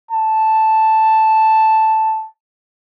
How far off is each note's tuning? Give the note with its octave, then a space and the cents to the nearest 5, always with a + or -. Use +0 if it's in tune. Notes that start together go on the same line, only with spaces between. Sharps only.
A5 +0